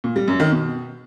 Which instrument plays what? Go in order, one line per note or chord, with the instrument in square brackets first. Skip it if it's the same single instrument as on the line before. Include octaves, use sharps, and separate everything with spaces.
[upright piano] A#2
G3
F#2
D#3
B2